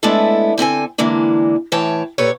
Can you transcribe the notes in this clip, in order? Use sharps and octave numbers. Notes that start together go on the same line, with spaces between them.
G#3 A3 B3 D4 E4 A4
D3 C4 A4 G#5
D3 E3 G#3 A#3 D4
A2 E3 C#5 G5 A5
A#2 G4 A4 B4 C#5